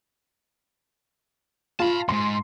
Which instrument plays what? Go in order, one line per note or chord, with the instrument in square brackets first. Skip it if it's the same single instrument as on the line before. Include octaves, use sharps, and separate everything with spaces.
[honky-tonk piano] F4 [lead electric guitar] A5 B5
[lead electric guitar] F2 G#2 [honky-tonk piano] C6